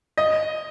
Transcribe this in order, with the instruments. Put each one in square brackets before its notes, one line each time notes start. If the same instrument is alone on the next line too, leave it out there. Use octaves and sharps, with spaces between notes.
[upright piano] D#5